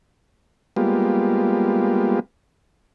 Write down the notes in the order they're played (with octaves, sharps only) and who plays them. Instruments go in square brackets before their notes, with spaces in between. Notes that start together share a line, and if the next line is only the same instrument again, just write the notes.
[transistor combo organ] G3 G#3 A#3 B3 F4 G4